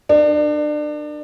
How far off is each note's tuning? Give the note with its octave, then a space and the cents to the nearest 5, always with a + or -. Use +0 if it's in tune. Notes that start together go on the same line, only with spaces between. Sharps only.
D4 +30 A#4 +0